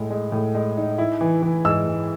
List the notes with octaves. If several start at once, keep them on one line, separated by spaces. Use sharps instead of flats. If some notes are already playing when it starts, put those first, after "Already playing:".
Already playing: A2 G#3
G#3
A2
G#3
D#4
E4
E3
E3
G#2 E6
G#2